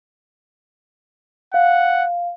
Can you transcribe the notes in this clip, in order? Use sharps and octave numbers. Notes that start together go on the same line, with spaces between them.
F5 F#5